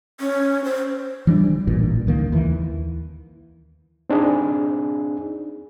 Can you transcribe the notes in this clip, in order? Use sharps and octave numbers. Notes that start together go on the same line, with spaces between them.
C#4
C5
E3 G3 D4
A1 G2 A#2
C#2 D#3 A#3
D#2 E3
C4 D4 D#4 G#4